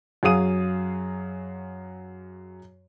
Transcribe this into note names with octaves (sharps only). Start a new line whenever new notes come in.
F#2 F#3 G#4 F5 D#6 D#7